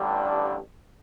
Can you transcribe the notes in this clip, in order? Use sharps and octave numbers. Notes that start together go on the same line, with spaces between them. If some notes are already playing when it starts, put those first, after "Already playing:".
Already playing: A1 G2 D3 G3